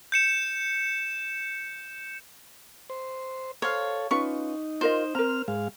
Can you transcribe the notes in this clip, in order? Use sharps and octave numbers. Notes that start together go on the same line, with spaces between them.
G6 C#7 E7
C5
A4 C5 C#5 F5
C#4 D#4 F4 B4 C#6
F4 A#4 C5 D#5
C4 A#4 A#5 F6
G#2 G#3 F5